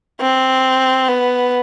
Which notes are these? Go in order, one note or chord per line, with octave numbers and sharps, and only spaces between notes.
C4
B3